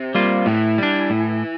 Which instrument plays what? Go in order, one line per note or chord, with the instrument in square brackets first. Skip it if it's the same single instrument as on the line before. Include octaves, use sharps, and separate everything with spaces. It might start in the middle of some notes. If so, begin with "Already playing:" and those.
Already playing: [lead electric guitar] C3
[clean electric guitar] G3 A#3 F4
[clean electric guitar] A2 [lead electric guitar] E3
[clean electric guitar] G3 D4
A2